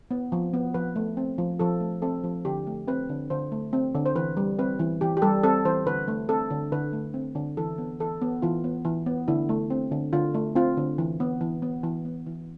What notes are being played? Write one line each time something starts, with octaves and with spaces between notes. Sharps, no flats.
B3
F3
B3
F3 B4
A3
C4
F3
F3 A4
A3
C4 A4
F3
D3 G4
A3
C4 B4
D3
D3 C5
A3
C4
D3
C5
E3 B4
G3
C4 B4
E3
E3 G4
G4
G3 A4
C4 A4
E3 C5
D3 B4
A3
C4 A4
D3
D3 B4
A3
C4
D3
E3 A4
B3
E3 A4
B3
E3 F4
B3
E3
B3
D3 E4
A3
C4
D3
D3 F4
A3
C4 F4
D3
E3
B3
E3
B3
E3
B3
E3